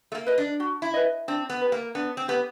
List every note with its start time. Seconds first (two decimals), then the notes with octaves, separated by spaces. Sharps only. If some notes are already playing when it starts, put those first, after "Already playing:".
0.12 A3
0.15 A#3
0.26 B4 D#5
0.38 D4
0.60 F#4
0.82 E4
0.94 B4 D#5
1.28 C4 D4
1.49 B3
1.61 G4 B4
1.72 A#3
1.95 B3 D4
2.17 C4
2.28 B3 G4 B4